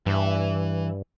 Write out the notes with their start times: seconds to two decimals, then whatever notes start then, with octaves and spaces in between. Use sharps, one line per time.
0.06 G2 E3 E5